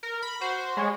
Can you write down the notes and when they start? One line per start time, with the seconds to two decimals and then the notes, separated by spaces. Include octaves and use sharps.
0.03 A#4
0.22 B5
0.41 F#4 C5
0.77 G#3 C#5